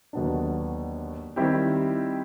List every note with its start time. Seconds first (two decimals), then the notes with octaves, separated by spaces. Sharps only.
0.13 D#2 D3 F#3 B3 D4
1.36 D#3 G3 C4 E4 G4